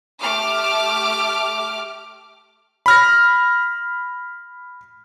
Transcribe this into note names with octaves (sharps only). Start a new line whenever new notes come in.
A3 G4 D6 F6
B5 F6 A#6